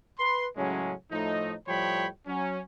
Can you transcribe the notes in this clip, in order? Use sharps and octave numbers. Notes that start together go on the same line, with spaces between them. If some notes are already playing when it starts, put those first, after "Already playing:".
B4 C6
A2 C#3 F#3 G#3 C#4
A2 F3 A3 D#4
A2 F3 G3 C#5 G5 B5
F#3 C#4